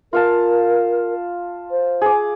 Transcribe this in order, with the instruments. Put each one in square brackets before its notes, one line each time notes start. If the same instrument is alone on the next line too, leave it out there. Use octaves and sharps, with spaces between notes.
[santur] F4 F5 A5 [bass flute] A#4
[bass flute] C5
[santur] G#4 D6